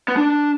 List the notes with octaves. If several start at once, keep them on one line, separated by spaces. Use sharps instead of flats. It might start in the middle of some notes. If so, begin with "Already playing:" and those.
B3
D4